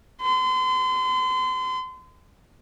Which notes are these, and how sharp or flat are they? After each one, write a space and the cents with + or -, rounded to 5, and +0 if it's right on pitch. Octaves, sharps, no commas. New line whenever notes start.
C6 -35